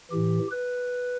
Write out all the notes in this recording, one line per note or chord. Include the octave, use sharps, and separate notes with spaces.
A2 E3 G4
B4